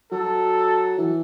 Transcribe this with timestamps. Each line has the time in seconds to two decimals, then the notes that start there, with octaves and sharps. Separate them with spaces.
0.12 F#3 A4
0.98 E3